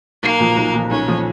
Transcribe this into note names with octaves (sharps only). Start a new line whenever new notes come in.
B1 A#3
A#2 F3
B1
A#2 F3
B1 C#4
A#2 F3